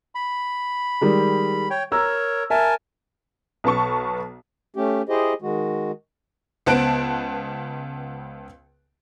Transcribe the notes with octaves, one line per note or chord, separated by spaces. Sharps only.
B5
D#3 G3 G#3
C#5 G5
A#4 C#5 A#5 E6
A#4 E5 G#5 A5
B1 B3 A5 C#6
A3 C#4 G4
E4 G4 G#4 C5 D#5
D#3 G#3 F#4
C#2 B3 C5 A5 F#6 D7